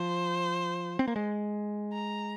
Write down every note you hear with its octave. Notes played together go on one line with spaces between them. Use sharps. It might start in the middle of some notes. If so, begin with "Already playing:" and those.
Already playing: F3 C5
C4
A#3
G#3
A#5